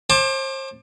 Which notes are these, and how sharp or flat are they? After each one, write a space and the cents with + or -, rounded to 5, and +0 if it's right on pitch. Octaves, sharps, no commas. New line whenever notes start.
C5 +35 A5 +0 D6 +25